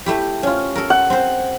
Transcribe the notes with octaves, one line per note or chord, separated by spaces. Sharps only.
A3 E4 G4
C#4 F4
A4 A#4
F#5
C4 C5